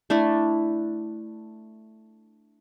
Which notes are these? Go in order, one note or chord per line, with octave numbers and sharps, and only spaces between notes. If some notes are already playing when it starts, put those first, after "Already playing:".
A3 D4 E4